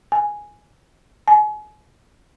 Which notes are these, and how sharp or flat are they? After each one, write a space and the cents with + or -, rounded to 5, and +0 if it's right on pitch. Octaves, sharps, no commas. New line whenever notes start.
G#5 +0
G#5 +35